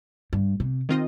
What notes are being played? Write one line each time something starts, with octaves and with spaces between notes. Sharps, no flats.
G2
C3
D#3 C4 F4 D#5